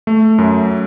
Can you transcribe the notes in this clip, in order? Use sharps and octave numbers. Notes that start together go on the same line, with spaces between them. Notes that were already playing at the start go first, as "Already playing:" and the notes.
A3
F#2